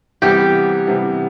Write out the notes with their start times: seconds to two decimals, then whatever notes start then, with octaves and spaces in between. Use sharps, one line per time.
0.22 C3 E3 G3 B3 G4
0.87 C3 E3 G3 B3